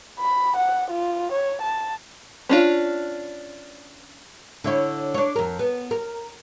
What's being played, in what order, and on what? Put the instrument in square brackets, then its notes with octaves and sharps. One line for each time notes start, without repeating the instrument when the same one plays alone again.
[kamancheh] B5
F#5
F4
C#5
A5
[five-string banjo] C#4 D4 F4
[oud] D3 E4 C#5
D4 C#5
F2 A#4
B3
A#4